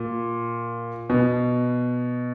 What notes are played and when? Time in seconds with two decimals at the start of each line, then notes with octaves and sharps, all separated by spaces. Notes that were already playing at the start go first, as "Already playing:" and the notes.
Already playing: A#2
1.10 B2